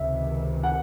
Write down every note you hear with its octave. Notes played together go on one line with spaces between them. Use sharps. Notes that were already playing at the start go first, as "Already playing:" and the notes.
Already playing: C#2 C3 D#3 E5
F#5